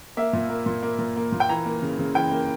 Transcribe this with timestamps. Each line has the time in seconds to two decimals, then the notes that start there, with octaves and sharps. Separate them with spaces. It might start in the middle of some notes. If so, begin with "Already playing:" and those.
0.17 A#3 E5
0.33 A#2
0.49 A#3
0.66 A#2
0.82 A#3
0.99 A#2
1.16 A#3
1.32 A#2
1.40 G5
1.49 E3 A#5
1.65 A#3
1.82 C#3
1.99 C#3
2.15 E3 G5
2.31 A#3